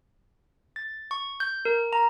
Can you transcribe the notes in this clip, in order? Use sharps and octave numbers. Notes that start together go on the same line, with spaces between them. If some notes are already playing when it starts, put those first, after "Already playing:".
A6
C#6
G6
A#4
A#5